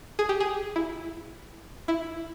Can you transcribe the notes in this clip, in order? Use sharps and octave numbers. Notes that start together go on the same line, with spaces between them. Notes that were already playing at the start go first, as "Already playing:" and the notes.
G#4
G4
G#4
E4
E4